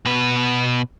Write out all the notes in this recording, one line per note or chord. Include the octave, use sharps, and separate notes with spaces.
B2 B4